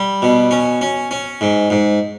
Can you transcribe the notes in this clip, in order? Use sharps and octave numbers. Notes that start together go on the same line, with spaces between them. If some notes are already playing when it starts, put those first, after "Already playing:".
Already playing: G3
B2
C#4
C#4
C#4
G#2
G#2